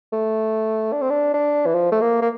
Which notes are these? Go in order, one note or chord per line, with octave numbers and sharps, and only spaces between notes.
A3
D4
C4
D4
D4
E3
F3
A3
A#3
A#3